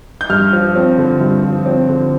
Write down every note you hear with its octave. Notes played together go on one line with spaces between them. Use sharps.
G6
G2 F6
F3
C4
D3
G2
F3
C4
D3